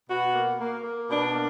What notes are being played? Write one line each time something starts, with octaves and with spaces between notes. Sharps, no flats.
B2 F#4
A#3
A#3
A#3
B2 D4
A#3